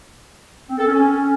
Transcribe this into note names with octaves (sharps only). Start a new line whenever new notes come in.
C4
A4
C#4